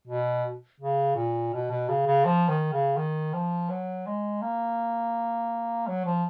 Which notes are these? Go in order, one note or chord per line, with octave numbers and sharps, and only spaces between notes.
B2
C#3
A#2
B2
B2
C#3
C#3
F3
D#3
C#3
D#3
F3
F#3
G#3
A#3
F#3
F3